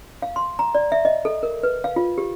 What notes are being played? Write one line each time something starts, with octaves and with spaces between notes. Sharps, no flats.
F5
C6
A#5
D5
E5
D#5
A4
A#4
B4
F5
F4
G4